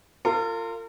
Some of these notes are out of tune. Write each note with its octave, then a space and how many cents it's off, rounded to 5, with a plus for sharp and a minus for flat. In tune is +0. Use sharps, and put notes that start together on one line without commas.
F4 -10 A#4 -45